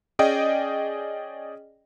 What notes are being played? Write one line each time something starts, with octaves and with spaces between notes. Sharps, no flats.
C#4 G#4 D5 D#5 G5